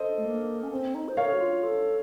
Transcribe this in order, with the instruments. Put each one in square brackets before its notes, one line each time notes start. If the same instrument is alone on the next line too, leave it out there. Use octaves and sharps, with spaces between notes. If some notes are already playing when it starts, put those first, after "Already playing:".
Already playing: [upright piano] A4 C5 D#5
[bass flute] A3
A#3
C#4
C4
D#4
C5
[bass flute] A#4 [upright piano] C#5 F5
[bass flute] A4
F#4
F4
A4